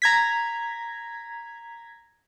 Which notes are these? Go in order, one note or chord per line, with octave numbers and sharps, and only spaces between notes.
A#5 G#6 B6